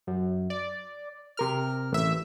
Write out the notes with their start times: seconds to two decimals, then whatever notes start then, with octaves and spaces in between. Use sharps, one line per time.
0.07 F#2
0.50 D5
1.37 C3 A#4 F6
1.92 A1 E5